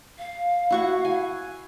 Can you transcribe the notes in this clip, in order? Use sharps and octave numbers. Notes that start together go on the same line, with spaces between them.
F5
E4 F#4 C#6
G#5